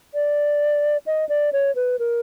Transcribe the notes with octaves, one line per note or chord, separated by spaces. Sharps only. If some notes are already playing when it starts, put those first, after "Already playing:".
D5
D#5
D5
C#5
B4
A#4